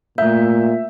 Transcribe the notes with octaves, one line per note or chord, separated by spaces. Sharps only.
A#2 A3 E5 G6